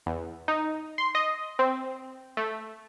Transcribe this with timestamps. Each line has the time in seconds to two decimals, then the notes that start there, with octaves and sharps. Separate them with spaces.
0.06 E2
0.48 D#4
0.98 C6
1.15 D#5
1.59 C4
2.37 A3